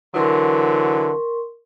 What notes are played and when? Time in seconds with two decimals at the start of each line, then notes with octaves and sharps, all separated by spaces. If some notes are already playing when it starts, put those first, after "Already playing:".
0.14 D3 E3 F#3 A#4 C6 C#6